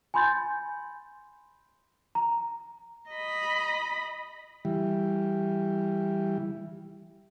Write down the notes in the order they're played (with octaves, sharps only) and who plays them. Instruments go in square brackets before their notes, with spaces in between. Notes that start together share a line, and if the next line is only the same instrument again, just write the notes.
[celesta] G#5 B5 C6 G6 A6
A#5
[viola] D#5 B5
[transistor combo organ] E3 G3